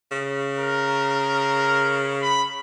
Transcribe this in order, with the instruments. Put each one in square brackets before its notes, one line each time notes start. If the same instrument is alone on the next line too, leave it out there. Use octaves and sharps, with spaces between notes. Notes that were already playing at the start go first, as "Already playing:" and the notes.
[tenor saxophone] C#3
[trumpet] A#4
B5